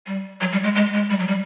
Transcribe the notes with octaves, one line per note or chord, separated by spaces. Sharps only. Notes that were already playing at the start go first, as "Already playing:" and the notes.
G3
F#3
G3
G#3
G#3
G#3
G3
F#3
G3